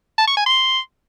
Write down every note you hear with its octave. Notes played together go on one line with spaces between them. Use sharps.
A5
C#6
G#5
C6